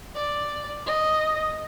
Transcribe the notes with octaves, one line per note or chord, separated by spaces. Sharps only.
D5
D#5